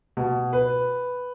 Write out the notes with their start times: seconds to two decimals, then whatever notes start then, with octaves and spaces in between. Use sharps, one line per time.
0.17 B2
0.53 B4